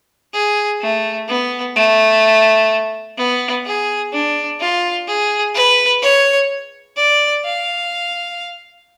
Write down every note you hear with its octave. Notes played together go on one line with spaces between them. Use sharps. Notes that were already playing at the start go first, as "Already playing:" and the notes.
G#4
A3
B3
A3
B3
G#4
D4
F4
G#4
B4
C#5
D5
F5